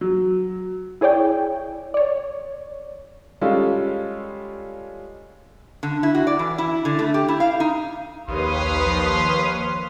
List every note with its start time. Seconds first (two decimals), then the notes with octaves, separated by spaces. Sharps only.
0.01 F#3
1.01 E4 G#4 C#5 D5 G5
1.94 C#5 D5
3.41 G3 G#3 C#4 F4 A4 F5
5.83 D3
6.03 E4
6.15 F#4
6.27 D5
6.39 E3
6.58 E4
6.85 D3
6.99 A3
7.14 G4
7.28 E4
7.40 F5
7.60 D#4
8.28 A#1 D#2 B4 C#5 F5 C6 D#6
8.87 F3